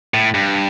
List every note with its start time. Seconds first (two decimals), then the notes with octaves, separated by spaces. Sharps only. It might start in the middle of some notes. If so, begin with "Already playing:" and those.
0.14 A2
0.34 G2